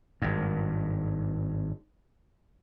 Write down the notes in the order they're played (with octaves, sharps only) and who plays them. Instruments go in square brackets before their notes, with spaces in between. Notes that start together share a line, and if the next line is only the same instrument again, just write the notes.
[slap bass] G#1 G2